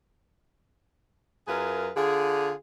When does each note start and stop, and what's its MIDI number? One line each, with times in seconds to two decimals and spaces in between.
1.47 1.90 42
1.47 1.90 65
1.47 1.90 68
1.47 1.90 70
1.47 1.90 71
1.96 2.53 50
1.96 2.53 65
1.96 2.53 68